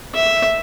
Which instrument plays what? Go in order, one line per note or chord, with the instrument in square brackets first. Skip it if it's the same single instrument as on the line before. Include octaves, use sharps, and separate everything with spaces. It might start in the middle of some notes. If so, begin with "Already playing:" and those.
[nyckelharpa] E5